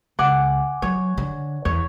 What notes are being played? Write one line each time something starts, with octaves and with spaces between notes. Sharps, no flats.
C#2 F#5 G#5 D6
F#3 C#5
D3
E2 C#5